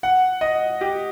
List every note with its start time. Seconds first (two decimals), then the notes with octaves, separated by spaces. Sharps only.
0.03 F#5
0.41 D#5
0.81 G4